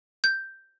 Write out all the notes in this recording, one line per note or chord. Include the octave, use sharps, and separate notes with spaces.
G6